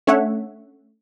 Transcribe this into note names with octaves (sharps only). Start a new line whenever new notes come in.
A3 C#4 D4 C#5 E5 F#5